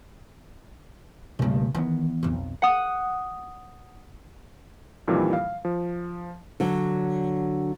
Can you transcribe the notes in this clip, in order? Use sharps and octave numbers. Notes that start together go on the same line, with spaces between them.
C#2 G2 B2 A3 A#3
D#3 E3 B3
B1 F2
F#5 D#6
F2 A#2 D#3 E3 G3
F5
F3
D3 F#3